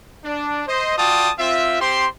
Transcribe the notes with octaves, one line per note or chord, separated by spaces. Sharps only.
D4
C5 D#5
F4 F#4 D5 G5 A5 D#6
C4 F4 E5
C4 G4 C5 C6